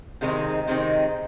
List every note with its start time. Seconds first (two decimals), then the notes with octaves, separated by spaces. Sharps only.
0.21 C3 D#3 G#3 C4 D#4
0.67 C3 D#3 G#3 C4 D#4